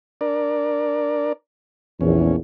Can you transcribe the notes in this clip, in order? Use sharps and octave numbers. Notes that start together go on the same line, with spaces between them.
D4 A#4 D5
A#1 E2 C#4